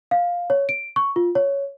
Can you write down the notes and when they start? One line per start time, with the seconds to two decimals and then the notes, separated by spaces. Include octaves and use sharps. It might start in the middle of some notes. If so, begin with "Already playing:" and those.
0.11 F5
0.50 C#5
0.69 D7
0.96 C#6
1.16 F4
1.35 C#5